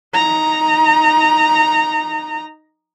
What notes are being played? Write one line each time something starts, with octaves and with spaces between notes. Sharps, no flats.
D#4 A#5